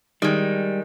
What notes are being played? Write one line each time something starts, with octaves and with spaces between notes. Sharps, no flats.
D#3 G3 G#3